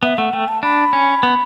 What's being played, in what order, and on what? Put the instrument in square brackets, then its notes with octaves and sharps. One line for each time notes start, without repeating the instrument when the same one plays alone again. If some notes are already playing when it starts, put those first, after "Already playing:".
[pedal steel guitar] B3 [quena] E5
[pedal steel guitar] A3 [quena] F#5
[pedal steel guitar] A3 [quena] G5
[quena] A5
[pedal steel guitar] D4 [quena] B5
[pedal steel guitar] C#4
B3